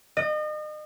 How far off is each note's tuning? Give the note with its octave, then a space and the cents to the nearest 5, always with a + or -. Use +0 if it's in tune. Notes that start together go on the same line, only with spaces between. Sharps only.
D#5 -35